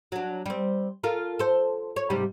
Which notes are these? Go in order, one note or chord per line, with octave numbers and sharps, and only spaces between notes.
F#3 D4
G3 C4
F4 A4 A#4
A4 C5
C#5
G#2 C3 G3